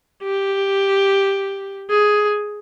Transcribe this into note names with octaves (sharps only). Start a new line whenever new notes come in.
G4
G#4